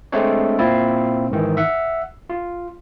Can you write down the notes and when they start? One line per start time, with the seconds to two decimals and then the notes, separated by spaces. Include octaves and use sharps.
0.12 G#3 A3 C4 D4 C#5
0.59 A#2 C4 E4 F4
1.31 G#2 D#3 E3
1.57 E5 F#5
2.30 F4